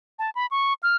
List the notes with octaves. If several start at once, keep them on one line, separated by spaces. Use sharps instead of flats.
A5
B5
C#6
F6